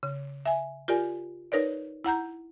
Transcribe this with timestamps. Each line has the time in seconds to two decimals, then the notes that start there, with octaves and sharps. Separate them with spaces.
0.03 C#3
0.46 E5 G#5
0.88 F4 G4 A#4 D5 G#5
1.52 D#4 A#4 B4 C#5 D5
2.05 E4 F#5 A#5 G6